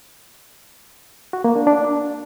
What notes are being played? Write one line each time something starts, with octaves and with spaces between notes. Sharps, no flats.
F#4
A#3
D4
D4